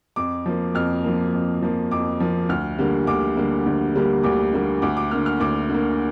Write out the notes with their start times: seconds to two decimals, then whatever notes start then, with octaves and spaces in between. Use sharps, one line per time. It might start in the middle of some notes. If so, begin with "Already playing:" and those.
0.16 F2 D6
0.46 F3 A#3
0.74 F2 F6
1.04 F3 A#3
1.33 F2
1.62 F3 A#3
1.91 F2 D6
2.20 F3 A#3
2.49 D2 F6
2.78 D3 G3 A#3
3.07 D2 D6
3.37 D3 G3 A#3
3.66 D2
3.95 D3 G3 A#3
4.23 D2 D6
4.53 D3 G3 A#3
4.82 D2 D6
4.97 D6
5.11 D3 A#3 F6
5.26 F6
5.40 D2 D6
5.70 D3 A#3